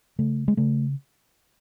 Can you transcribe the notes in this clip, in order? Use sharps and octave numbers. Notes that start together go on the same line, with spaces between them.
C#3 A3
G#3
C#3 A3